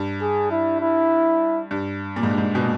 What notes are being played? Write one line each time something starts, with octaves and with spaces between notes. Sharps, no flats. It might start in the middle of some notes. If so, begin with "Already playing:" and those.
Already playing: G2
G#4
E4
E4
G2
A#2
G#2
G2
G#2
B2
A#2